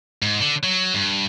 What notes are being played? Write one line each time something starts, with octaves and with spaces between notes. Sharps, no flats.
G#2
D3
F#3
G2